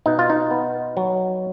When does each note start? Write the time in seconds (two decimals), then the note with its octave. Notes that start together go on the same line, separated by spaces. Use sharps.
0.06 B2 D#4
0.19 F4
0.30 D#4
0.51 B3
0.97 F#3